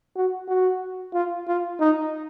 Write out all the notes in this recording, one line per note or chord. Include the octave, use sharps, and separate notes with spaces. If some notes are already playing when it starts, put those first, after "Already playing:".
F#4
F#4
F4
F4
D#4